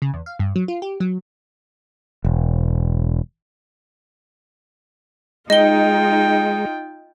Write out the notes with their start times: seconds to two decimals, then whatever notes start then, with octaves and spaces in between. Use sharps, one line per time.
0.02 C#3
0.14 E2
0.26 F5
0.39 G2
0.56 F#3
0.68 F4
0.82 G4
1.00 F#3
2.25 E1
5.50 G#3 D#4 F4 D#5 G5 G7